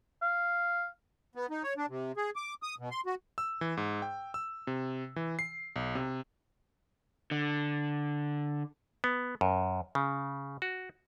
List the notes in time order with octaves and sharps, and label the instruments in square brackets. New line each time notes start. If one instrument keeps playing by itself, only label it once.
[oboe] F5
[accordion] B3
D#4
C#5
D4
C3
G#4
D6
D#6
B2
C6
F#4
[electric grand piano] E6
E3
G#2
G5
E6
C3
E3
C7
B1
C3
[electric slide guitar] D3
[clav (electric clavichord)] B3
F#2
C#3
F#4